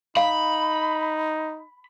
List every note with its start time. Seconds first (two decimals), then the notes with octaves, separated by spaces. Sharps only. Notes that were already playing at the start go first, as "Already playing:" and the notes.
0.17 D#4 F5 B5